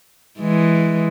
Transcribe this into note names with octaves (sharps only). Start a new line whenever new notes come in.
E3 G#3